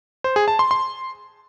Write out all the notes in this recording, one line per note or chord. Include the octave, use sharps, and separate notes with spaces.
C5
G#4
A5
C6
C6